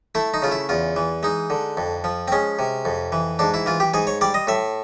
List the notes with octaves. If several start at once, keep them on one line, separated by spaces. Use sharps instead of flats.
A3 E4
D#4
C#3 F4
E4
E2 F4
E3
G#3 D#4
D3
F2
F3
C4
G#3 C#4
C3
F2
E3
G#2 D4
E4
E3 F4
G4
G#2 G#4
C#5
G3 D5
D#5
A2 E5